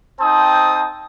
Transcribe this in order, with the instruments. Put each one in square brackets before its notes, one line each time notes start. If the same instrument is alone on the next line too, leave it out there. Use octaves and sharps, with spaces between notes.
[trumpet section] C4 D#4 C5 G5 A5 D#6